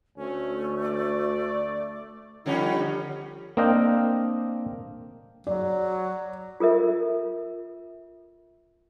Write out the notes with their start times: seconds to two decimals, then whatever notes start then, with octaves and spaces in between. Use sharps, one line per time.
0.18 D2 A3 C#4
0.84 D5
2.46 D3 F3 G3 C#4 D#4 F#5
3.57 A#3 C4 D4 D#5 F5 G5
5.47 F#3 D5
6.60 F4 A4 A#4 E5